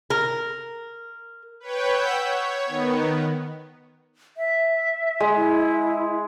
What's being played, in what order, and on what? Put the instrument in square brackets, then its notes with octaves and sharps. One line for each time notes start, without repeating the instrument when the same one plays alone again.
[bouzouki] A#4
[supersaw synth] B4 C#5 G5
F#5 E6 G6 B6
C#5
D#3 B3
[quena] E5
[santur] G#3
[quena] E4